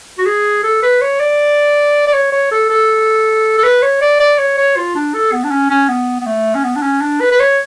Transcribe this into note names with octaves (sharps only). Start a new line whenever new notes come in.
F#4
G#4
A4
B4
C#5
D5
D5
C#5
C#5
A4
A4
A4
B4
C#5
D5
D5
C#5
C#5
F4
D4
A4
B3
D4
C#4
C#4
B3
B3
A3
C#4
B3
D4
C#4
D4
B4
B4
C#5